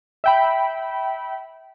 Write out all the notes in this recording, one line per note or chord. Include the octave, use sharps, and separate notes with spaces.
E5 G5 B5